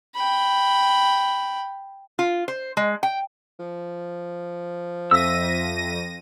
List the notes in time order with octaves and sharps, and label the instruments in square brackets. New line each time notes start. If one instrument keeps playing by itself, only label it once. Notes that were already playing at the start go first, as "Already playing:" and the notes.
[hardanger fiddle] G5 B5
[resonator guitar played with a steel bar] F4
C5
G#3
G5
[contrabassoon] F3
[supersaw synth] F2 A#6 D#7 [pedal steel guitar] E5 E6